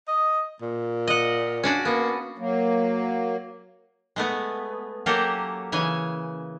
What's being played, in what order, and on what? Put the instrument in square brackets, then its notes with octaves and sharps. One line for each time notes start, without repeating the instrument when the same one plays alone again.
[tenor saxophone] D#5
A#2
[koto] D#5 F#5
C#4 D4 F#4
[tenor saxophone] A#3 [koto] B3
[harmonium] F#3 A#3
[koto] G#3 A3 B3
F#3 A#3 C#4 G4 A4 A#4
C#3 E3 G#5